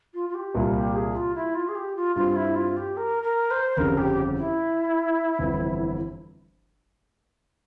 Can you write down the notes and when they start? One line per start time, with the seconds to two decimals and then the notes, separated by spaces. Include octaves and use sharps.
0.14 F4
0.29 F4
0.34 G4
0.55 C2 A#2 G3 A#3 F4
0.75 G4
0.95 G#4
1.15 F4
1.35 E4
1.55 F4
1.68 G#4
1.75 G4
1.96 F4
2.16 G2 G3 C4 F4
2.36 E4
2.55 F4
2.77 G4
2.97 A#4
3.23 A#4
3.51 C5
3.77 G1 F2 C#3 G3 A#4
3.98 G4
4.38 E4
5.39 G1 F2 E3